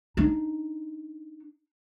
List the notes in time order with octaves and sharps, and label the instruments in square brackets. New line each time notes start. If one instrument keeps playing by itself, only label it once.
[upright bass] D4 D#4